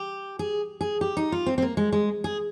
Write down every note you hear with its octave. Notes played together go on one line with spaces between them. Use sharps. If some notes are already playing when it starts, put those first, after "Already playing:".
Already playing: G4
G#4
G#4
G4
D#4
F4
C4
C4
A#3
G#3
G#3
G#4